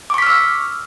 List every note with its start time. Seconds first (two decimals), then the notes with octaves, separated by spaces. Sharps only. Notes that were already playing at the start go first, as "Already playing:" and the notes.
0.10 D6
0.14 C#6
0.18 B6
0.22 F6
0.27 E6